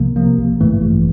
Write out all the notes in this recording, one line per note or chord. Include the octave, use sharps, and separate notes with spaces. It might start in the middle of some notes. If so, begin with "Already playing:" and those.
Already playing: C2 C3 F3 A#3
C3 F3 A#3
A1
G2 E3 A3
A1